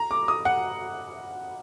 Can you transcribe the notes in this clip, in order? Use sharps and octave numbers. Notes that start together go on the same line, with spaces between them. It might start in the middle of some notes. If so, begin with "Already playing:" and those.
Already playing: A#5
D6
D#6
F#5